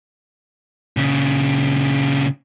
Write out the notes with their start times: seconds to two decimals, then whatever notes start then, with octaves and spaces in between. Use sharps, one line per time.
0.97 A#2 C#3